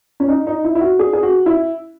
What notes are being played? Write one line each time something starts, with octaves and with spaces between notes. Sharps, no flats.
C#4
D#4
D#4
E4
E4
F#4
G#4
G#4
F#4
E4